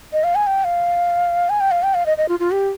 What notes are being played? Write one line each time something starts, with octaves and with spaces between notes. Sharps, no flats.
D#5
F5
G#5
G5
F5
G#5
G5
F5
G5
F5
D#5
D#5
F4
F4
G4